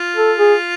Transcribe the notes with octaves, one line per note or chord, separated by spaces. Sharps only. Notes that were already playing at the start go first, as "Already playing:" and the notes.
Already playing: F4
A4
G#4